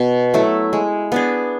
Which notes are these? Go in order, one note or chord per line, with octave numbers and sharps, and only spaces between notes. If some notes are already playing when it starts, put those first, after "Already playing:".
Already playing: B2
F#3 A3 E4
G#3
B3 D4 G#4